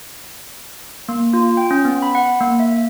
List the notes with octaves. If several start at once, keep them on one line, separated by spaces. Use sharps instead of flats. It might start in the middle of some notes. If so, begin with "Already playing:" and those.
A#3
F4
G5
C#4
B3
B5
F#5
A#3
E5